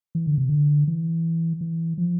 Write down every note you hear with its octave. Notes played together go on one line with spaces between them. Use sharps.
E3
D3
C3
D3
E3
E3
F3